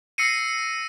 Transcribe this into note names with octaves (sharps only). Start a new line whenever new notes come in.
E6 A#6 C7 C#7 D#7